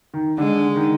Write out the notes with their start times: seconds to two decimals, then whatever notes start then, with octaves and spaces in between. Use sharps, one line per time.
0.14 D#3
0.38 D3 G#3
0.76 D#3